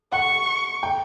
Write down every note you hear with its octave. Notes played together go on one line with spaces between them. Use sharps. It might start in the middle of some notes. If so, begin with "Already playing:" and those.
F#5 C#6
G5